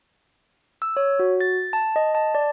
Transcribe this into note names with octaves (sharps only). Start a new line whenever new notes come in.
E6
C#5
F#4
A6
A5
D#5
A5
D5